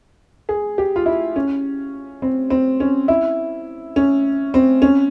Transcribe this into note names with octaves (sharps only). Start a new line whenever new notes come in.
G#4
G4
F4
E4
C#4
C4
C4
C#4
E4
C#4
C4
C#4